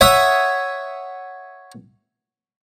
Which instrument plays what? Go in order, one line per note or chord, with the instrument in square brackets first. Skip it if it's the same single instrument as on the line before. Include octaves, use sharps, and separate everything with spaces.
[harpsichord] C#5 E5 F#5 D#6